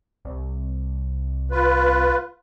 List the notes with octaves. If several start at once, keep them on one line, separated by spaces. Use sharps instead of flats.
C2
F4 B4